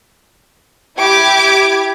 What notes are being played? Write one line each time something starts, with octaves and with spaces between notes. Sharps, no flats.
E4 G4 D6 G#6